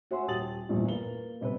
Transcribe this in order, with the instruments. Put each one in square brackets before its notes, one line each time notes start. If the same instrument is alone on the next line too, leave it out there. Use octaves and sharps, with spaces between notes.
[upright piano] F#4 C#5 E5 F#5 G#5 C6
D#1 G4 A5 D#6 A6 F#7
A#1 E2 G2 A#2 G3
A#3 B4 G7
G1 C3 B4